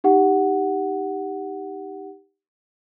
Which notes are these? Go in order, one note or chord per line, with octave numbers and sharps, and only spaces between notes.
D#4 G4 F#5